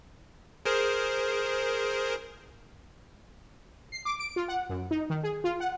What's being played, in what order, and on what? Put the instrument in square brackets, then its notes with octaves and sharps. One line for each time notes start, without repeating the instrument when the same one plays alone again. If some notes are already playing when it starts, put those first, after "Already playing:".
[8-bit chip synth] G#4 A#4 C5
[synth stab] C7
D6
D7
F4
F#5
F#2
D#4
D#3
G#4
F4
F#5